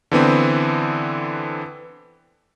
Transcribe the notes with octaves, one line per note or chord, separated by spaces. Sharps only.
D3 E3 B3 C4